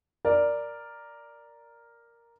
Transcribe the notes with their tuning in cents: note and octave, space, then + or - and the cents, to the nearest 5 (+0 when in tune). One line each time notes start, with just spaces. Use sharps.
A#4 +0 D5 +0